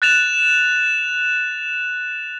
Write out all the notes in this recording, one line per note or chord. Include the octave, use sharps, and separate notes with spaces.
F#6 A6 E7 F7